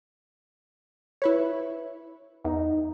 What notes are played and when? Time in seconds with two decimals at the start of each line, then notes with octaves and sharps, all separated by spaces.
1.22 E4 B4 C#5
2.44 E2 D#4